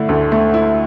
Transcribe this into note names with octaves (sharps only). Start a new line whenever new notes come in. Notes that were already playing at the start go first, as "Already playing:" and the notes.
Already playing: D3 A3 E4
D2
A3
E4